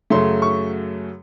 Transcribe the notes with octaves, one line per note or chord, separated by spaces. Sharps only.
F#2 C#3 F#3 A3 C6
C#6